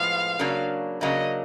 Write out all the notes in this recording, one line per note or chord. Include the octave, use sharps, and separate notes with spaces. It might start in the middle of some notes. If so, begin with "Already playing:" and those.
Already playing: A2 F3 G#3 B3 F5
C#3 F#3 A#3 D4
C#3 F#3 A#3 D4 D#5